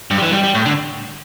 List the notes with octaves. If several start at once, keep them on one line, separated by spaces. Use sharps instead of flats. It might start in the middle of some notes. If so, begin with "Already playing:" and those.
G2
G3
E3
G3
G3
A2
D3